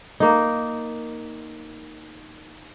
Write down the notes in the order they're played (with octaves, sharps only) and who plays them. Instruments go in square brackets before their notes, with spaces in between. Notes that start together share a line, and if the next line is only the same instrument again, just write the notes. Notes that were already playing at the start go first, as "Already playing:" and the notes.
[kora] A#3 D#4